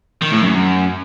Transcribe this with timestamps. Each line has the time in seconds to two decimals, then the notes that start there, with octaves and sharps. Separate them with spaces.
0.22 D#3
0.32 A2
0.42 F#2